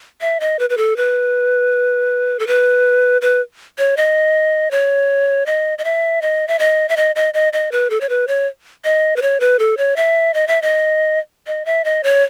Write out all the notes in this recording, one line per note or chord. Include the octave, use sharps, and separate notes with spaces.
E5
D#5
B4
B4
A4
B4
A4
B4
B4
C#5
D#5
C#5
D#5
D#5
E5
D#5
E5
D#5
E5
D#5
D#5
D#5
D#5
B4
A4
C#5
B4
C#5
D#5
B4
C#5
B4
A4
C#5
E5
D#5
E5
D#5
D#5
E5
D#5
C#5